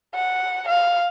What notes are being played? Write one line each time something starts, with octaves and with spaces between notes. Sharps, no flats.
F#5
F5